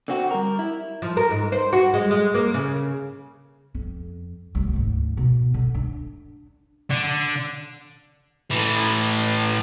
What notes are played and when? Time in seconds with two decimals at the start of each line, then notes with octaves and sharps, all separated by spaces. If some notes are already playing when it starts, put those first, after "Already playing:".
0.08 D3 C4 F#4
0.31 G3 A#4
0.59 E4
1.02 F3
1.17 A#4
1.30 G#2
1.52 C5
1.73 F#4
1.94 G#3
2.11 G#3
2.35 A#3
2.54 C#3
3.75 F2
4.55 D2 F#3
4.73 D2 G#2
5.17 B2
5.54 D3
5.75 D4
6.91 D3
8.51 A2 E3